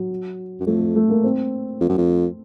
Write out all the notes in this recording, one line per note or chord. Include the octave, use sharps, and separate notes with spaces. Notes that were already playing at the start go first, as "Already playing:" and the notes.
Already playing: F#3
F#2
F2 A3
A3
A#3
C4
F2
F#2
F2